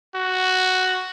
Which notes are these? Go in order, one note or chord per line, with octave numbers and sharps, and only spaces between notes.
F#4